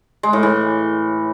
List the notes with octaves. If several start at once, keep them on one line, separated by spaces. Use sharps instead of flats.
G#3
A2
E3